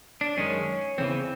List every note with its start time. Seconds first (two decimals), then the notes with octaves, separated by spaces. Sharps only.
0.21 D4
0.37 F#2 D#3 G#3 C#4
0.98 E2 C#3 E3 C4